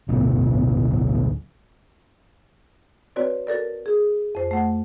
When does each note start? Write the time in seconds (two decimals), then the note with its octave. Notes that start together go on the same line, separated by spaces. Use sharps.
0.08 A1 D2 B2
3.16 C4 F#4 B4 C#5 D5
3.47 F#4 A4 A#4 D5
3.86 G#4
4.35 F2 C5
4.51 A3 F#5